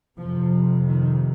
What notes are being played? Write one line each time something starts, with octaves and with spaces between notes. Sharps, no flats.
F2 C3 F3
D#3